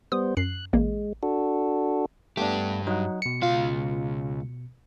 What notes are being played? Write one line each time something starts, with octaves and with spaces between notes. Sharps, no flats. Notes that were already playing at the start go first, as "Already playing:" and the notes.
G3 B3 C5 D#6
F#2 F#6 C7
A1 G#3 A#3
D4 F#4 A4
G2 A3 B3 D4 G4
F#3 D#4 F#5
B2 C#7
C#2 F4 F5